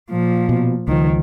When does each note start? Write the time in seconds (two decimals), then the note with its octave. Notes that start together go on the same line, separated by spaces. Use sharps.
0.11 A#2 F3
0.49 B2
0.88 C#2 D#3 F3